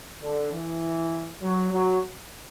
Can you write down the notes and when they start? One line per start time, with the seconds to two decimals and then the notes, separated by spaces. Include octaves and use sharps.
0.23 D3
0.52 E3
1.42 F#3
1.72 F#3